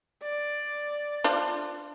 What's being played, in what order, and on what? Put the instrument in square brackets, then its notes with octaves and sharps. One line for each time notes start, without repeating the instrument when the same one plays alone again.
[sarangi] D5
[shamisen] D4 F4 C5